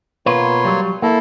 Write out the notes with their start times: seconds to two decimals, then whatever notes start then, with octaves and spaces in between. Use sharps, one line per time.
0.26 B2 A#3 F4 B4 C#5 C6
0.65 F#3 G3
1.02 A#3 E4 A4